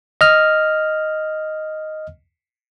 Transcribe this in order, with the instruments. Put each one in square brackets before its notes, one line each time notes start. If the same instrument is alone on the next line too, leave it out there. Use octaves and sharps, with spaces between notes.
[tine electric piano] D#5 F6